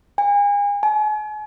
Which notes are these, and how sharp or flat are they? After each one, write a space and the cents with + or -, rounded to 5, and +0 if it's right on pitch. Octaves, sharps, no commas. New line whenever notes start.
G#5 -35
G#5 +40